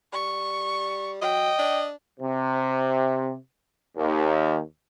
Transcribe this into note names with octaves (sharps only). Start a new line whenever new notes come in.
G3 C#6
F#3 D#5 G5
D4
C3
D#2